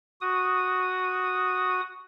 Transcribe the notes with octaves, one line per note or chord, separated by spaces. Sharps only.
F#4 D#6